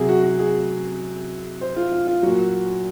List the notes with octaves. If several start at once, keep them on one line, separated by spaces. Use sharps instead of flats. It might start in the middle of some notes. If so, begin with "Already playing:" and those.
Already playing: C3 F#3 G#4
F#4
F#4
G#4
C5
F4
F4
F4
A#2 F#3 F#4